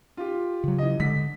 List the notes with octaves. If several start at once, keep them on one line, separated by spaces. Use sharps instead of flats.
F4 G4
C#3 F#3
E3 D#5
D3 G#3 B6